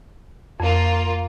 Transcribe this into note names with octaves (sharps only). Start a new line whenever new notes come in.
F2 A#3 F4